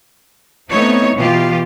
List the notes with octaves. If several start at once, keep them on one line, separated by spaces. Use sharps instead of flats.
A3 B3 C4 D#4 E4 C#5
B2 E3 F4 G4